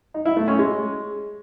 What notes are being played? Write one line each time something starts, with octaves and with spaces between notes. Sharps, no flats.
D#4
E4
A3
C#4
G#3